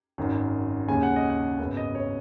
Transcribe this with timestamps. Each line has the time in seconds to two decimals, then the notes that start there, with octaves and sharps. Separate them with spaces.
0.18 G#1 F#2 D#3
0.88 D#2 C#3 G#3 C#4 G#5
1.03 F#5
1.16 D#5
1.30 F#5
1.59 G#1 F#2 C#3 B3
1.77 D#5
1.95 C#5